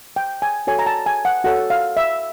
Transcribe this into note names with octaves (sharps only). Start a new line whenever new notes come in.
G5
G#5
F#4 A4 C#5 G#5
A#5
A5
G#5
F#5
F#4 A4 C#5 F#5
F5
E5